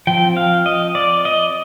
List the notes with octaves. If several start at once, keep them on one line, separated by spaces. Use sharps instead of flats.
F3 C4 G5
F5
D#5
D5
D#5